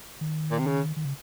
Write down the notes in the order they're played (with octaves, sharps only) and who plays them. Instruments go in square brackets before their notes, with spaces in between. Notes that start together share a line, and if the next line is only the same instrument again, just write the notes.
[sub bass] D#3
[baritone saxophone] A#2
C3
C#3
[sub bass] D#3
C#3